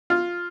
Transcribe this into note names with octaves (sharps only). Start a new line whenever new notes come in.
F4